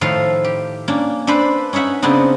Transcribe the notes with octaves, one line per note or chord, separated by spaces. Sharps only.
A2 D#3 F3 A4 F5
G4
A#3 C#4 D4
D4 A4 B4 C5 B5
C#4 D#4 C#5 E5 F#5
C#3 B3 C4 D4 D#4